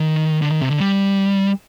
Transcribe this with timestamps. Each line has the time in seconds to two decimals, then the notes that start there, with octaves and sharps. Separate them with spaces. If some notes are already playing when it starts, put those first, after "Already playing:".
Already playing: D#3
0.42 D3
0.52 D#3
0.62 C3
0.70 D3
0.80 G3